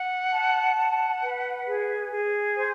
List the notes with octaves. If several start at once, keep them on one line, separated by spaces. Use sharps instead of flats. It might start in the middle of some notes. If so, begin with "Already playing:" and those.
Already playing: F#5
A5
F#5
B4
G#4
G#4
C5